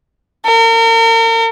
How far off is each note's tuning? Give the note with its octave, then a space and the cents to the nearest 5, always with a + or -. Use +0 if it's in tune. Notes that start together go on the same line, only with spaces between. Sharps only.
A#4 -40